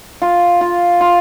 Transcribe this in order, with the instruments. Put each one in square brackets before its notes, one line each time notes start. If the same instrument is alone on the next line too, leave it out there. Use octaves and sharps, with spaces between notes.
[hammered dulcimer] F4
F4
F4